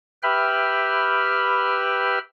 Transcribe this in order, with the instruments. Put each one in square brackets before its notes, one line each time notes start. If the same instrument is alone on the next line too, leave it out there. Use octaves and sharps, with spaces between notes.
[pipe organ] G4 B4 E5 G5 B5 F6